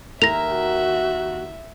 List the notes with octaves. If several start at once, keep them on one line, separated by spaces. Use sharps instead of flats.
D#2 A#4 E5 A#6 F7
F#4